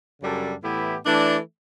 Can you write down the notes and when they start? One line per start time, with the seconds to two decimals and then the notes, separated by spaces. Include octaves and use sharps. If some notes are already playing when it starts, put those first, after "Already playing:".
0.21 F#2 C#3 G3 D4 A4
0.63 A2 E3 B3 E4 G4
1.05 E3 A3 D4